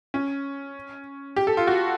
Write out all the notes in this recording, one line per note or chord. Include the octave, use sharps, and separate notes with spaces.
C#4
G4
A4
F4
F#4